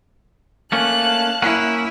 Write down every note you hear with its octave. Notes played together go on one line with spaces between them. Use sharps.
A3 A#3 C#4 F5 A5 F#6
A#3 C#4 E4 F#5